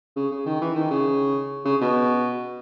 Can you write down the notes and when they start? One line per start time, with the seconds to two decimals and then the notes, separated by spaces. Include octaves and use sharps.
0.16 C#3
0.31 C#3
0.46 D#3
0.61 E3
0.76 D#3
0.91 C#3
1.65 C#3
1.81 B2